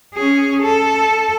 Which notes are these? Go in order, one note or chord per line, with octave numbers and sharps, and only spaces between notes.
C#4 G#4
A4